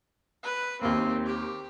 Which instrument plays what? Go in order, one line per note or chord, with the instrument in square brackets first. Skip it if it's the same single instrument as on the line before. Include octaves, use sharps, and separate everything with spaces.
[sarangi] B4
[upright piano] D#2 A#3 [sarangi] C4
[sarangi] G4